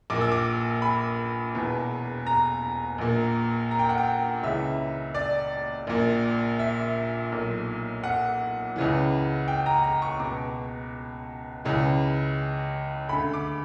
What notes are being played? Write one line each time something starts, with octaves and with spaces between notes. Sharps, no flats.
A#1 A#2 D6
E6
D6
B5
E1 E2 B2
A#5
A#1 A#2
A#5
G5
F#5
G5
C#2 C#3 E3 E5
D5
A#1 A#2
E5
B1 A#2
F#5
C#2 C#3 E3
G5
A#5
A#5
C#6
C#2 B2 D6
C#2 C#3 E3
D2 D3 B5
D6